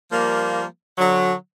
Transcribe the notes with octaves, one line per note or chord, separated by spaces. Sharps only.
F3 G3 A#3
D3 F#3